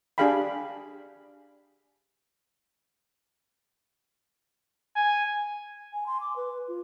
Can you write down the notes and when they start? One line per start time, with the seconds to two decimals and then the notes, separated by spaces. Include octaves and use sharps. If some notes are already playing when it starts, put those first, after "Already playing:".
0.18 D4 G4 G#4 F5 G5 B5
4.96 G#5
5.93 G#5
6.07 C6
6.21 D6
6.36 B4
6.68 F4